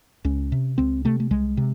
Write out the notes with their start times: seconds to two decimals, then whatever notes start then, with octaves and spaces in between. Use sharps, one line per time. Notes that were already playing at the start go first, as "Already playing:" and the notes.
0.25 C#2 C#4
0.52 C3
0.78 C#2 C4
1.05 C3 A3
1.20 A3
1.31 C2 G#3
1.57 C3